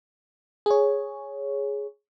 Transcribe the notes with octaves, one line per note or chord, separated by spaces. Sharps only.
G#4 C#5